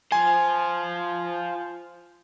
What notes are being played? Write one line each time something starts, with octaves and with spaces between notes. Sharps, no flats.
F4 C5 G#5